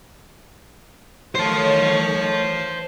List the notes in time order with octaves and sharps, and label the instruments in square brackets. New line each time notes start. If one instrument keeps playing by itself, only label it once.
[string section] D#3 A3 C#5 [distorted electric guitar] C5 A5